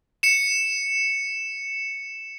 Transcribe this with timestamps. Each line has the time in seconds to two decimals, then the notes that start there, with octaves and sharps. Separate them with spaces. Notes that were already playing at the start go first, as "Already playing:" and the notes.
0.23 C#7 E7